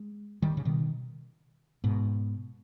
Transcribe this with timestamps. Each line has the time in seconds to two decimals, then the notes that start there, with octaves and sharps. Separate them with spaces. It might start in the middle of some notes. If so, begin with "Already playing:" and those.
Already playing: G#3
0.42 D#3 G3
0.57 C#3
0.65 B2 D#3
1.84 G#2 B2